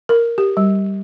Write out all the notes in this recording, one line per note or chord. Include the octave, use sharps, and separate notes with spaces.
A#4
G4
G3